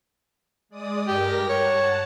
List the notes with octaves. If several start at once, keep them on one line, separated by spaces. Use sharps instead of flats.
G#3 D5 D#6
G2 G4 A#4 A#6
C#5 F#5 A5